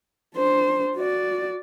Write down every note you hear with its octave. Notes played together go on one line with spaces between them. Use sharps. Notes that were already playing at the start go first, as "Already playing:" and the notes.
D4 C5
F#4 D5